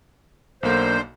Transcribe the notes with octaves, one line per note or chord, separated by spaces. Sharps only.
B1 D3 A#3 C5